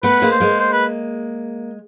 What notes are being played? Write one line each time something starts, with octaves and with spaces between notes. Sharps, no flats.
A3 B3 B4
G#3 A#3
C5
G#3 A#3
C5
B4